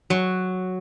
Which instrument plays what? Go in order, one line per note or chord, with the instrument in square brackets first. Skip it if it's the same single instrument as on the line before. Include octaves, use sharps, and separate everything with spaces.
[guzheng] F#3